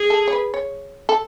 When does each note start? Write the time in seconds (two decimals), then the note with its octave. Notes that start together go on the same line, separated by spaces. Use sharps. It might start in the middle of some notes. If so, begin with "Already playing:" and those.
Already playing: G#4
0.10 A4
0.28 C#5
0.33 B4
0.54 C#5
1.09 A4